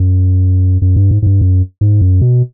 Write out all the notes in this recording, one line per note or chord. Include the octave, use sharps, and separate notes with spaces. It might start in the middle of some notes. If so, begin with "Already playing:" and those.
Already playing: F#2
F#2
G2
G#2
G#2
G2
F#2
G#2
F#2
B2